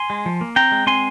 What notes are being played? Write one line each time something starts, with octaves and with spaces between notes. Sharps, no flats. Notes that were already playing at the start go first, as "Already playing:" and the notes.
Already playing: G#5 C6
G#3
F3
A#3
C4 G5 A#5
G#3
C4 G#5 C6